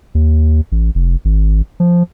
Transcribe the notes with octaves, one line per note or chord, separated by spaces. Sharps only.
D#2
A1
F1
G#1
F3